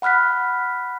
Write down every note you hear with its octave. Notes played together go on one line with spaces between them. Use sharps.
F#5 B5 F6 F#6 B6